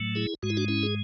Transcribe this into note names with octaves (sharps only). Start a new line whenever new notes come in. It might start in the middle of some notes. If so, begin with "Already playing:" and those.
Already playing: A2 F#3 A3
E4 G#4
G#2 G#3 F#4
E4
D4 F#4
C#4 E4
G#4